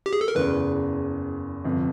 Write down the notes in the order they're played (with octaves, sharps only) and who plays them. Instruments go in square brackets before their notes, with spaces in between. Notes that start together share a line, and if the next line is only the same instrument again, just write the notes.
[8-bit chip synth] G4
G#4
A4
A#4
[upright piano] F#1 E2 C#3 [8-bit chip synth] B4
[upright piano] G1 F2 C3